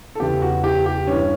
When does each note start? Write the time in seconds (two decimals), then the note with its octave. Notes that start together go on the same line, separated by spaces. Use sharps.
0.15 A4
0.20 E2 C#3 E3 G4
0.42 F#4
0.64 G4
0.86 G4
1.07 G2 E3 C#4